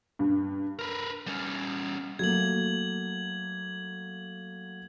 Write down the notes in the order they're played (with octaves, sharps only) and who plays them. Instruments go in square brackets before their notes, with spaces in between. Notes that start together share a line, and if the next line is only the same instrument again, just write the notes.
[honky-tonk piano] G2
[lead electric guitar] A#4 B4
G3 C#4
[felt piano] F#3 A3 A#3 [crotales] G#6 F#7